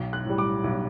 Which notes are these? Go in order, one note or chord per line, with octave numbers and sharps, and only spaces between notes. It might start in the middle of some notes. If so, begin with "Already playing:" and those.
Already playing: B1
F#6
A2 G3
D6
B1